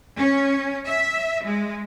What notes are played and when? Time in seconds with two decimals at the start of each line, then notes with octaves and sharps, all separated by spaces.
0.17 C#4
0.86 E5
1.44 G#3